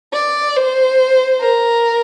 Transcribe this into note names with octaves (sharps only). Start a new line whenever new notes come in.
D5
C5
A#4